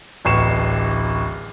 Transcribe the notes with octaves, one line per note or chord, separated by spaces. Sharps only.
D1 A1 C#6 C7 E7